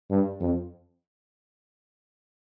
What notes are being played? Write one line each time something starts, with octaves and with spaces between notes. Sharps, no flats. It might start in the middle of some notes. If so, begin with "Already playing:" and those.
G2
F2